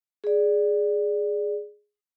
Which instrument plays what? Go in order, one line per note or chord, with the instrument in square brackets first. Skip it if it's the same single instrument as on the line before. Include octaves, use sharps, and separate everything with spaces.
[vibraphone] G#4 D5